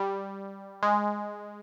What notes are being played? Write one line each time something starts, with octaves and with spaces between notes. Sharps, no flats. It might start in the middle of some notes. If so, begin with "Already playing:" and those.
Already playing: G3
G#3